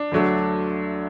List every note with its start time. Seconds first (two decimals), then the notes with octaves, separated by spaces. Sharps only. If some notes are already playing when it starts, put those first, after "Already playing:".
Already playing: D4
0.12 D2 D3 F#3 A3